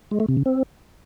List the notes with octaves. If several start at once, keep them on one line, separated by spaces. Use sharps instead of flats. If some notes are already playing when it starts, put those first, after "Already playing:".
G#3
A3
C3
C#3
C4